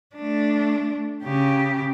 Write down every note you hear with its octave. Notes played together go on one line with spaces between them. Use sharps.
A3 D4
C#3 G4